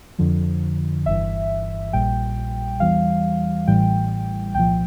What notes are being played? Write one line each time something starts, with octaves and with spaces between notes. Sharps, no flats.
F2 D3 F3
G1 G2 E3 E5
A#1 A#2 G3 G5
E2 E3 G3 F5
A1 A2 E3 G3 G5
C2 A#2 F3 G5